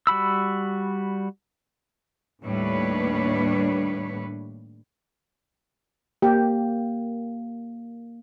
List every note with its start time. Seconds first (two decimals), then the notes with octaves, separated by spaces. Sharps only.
0.07 G3 F#4 B5 E6
2.43 D#2 A2 G3 D4 B4 C#5
6.22 A#3 G4